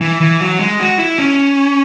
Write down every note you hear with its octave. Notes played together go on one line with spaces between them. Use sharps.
E3
E3
F#3
G#3
F#4
E4
C#4